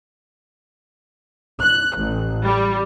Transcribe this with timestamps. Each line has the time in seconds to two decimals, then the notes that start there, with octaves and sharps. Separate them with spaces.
1.61 F#6
1.97 A1
2.45 G3